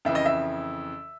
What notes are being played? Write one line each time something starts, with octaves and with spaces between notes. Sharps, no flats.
F2 C#3 E3 E5
D#5
E5